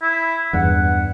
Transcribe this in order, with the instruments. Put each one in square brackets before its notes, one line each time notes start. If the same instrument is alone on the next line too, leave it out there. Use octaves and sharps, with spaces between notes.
[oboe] E4
[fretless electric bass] E2 G2 [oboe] F#5